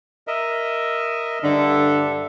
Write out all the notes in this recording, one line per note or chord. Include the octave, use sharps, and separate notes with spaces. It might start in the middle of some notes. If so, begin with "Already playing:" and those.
A#4 D#5 E5
G2 D3 A4 E5